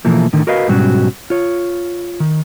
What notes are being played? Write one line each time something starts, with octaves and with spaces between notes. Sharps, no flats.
B2 E3 F3 A3 A#3
A2 D3 D#3
F#4 A#4 B4 D#5 F5
G#2 B2 F#3 G3 C#4 F#4
F4 C#5
D#3